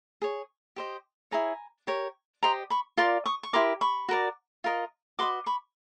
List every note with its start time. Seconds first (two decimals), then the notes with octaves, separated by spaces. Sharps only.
0.22 G#4 C#5
0.76 G4 C5 D#5
1.31 E4 G#4 C#5 G#5 A#5
1.87 G4 A#4 C#5
2.43 G4 C5 D#5 A#5 C6
2.70 B5 C#6
2.97 F4 A#4 D5 C6 D6
3.26 C#6 D#6
3.43 C#6
3.53 E4 G4 A#4 C6 D6
3.81 B5 C#6
4.08 F#4 A#4 D5
4.64 F4 A#4 D#5
5.19 F#4 B4 D#5 C6 D6
5.46 B5 C#6